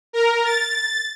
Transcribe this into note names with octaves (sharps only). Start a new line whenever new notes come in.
A#4
A6